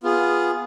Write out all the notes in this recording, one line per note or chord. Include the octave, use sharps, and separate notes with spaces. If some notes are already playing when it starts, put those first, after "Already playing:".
B3 F4 G#4